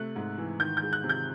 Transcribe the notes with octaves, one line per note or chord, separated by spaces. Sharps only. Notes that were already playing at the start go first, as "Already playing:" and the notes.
Already playing: C3 A3 F#6
G#2
E3
D#3 G6
G6
G#3
F#6
C3
G6